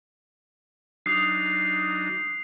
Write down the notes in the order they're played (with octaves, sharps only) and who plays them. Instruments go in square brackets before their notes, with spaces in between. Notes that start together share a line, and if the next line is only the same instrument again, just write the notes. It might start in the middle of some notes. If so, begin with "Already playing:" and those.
[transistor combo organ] F#3 D4 D#4 [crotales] D#6 C7